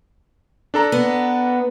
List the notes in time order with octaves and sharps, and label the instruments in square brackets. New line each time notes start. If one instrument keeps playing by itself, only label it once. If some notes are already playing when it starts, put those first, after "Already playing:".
[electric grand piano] D4 A4 A#5
[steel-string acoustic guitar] B3